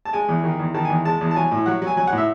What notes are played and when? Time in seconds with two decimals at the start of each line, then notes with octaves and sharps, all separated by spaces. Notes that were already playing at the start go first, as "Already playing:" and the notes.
0.05 A5
0.13 G#3 G#5
0.29 E2
0.44 D#3
0.59 E2
0.74 D#3 A5
0.85 G#5
0.90 E2
1.05 G#3 A5
1.21 E2
1.31 A5
1.36 F#3 G#5
1.51 A2
1.66 F#3 F#5
1.82 F#3
1.87 G#5
1.97 F#3 G#5
2.07 F#5
2.13 A2 E5